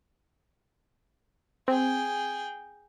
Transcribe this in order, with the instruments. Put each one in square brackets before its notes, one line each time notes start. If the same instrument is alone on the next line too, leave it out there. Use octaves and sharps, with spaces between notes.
[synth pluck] C4 [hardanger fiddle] G#4 G5